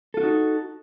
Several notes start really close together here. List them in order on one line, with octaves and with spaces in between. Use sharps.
A4 F4 F#4 D#4